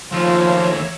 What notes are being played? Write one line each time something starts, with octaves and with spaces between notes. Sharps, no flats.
D#2 F3 A3 A#3 F4 C#5 E5